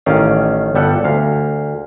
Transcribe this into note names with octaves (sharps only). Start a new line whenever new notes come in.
A1 D#3 C#4 D5 F5
G1 G3 A4 F#5
D2 F5